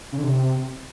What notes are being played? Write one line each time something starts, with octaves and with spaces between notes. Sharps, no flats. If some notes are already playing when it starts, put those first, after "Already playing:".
C#3
D3
C3